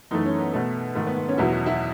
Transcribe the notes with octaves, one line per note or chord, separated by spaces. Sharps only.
F#2 E3 A3 D#4
C#4
B3
B2 A3
G#2 D#3 A3
B3
B3
C#4
E2 B2 F#3 E4
F#4
E4